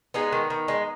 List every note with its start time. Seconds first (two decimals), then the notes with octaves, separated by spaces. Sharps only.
0.14 G#3 B3 D#4
0.32 D#3
0.50 D#3
0.68 G#3